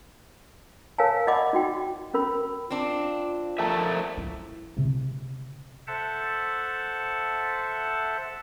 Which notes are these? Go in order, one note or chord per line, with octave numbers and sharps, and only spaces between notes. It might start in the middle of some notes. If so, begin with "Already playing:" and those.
A#4 C#5 F5 G#5 A5
D5 D#5 F#5 B5 D6
D#4 F#4 G5
C#4 A#4 B5
C4 D4 F4
F3 A4 A#4 E5 A5 A#5
E4
C3
A4 C5 E5 F#5 A5